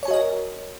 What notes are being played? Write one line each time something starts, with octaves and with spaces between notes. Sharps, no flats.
F#4 A#4 C#5 D#5 G#5